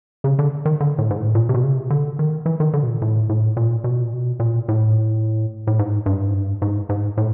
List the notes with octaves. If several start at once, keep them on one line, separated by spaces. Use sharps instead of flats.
C#3
D3
D#3
D3
A2
G#2
A2
A#2
C3
B2
C#3
C3
D3
D#3
E3
D#3
D3
B2
A#2
A2
A2
A#2
B2
A#2
B2
A#2
A2
A2
G#2
G2
G#2
G2
G#2
G#2
A2